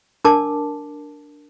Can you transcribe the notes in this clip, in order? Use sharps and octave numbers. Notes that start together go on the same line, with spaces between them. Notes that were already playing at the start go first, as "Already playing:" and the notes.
D4 A#4 A5 D6